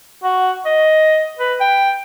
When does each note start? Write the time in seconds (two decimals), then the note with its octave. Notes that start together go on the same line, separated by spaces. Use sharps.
0.24 F#4
0.65 D#5
1.39 B4
1.61 G5